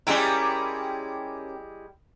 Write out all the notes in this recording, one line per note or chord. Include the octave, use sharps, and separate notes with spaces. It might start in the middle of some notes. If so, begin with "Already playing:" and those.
G3 G#3 C#4 E4 G4 A#4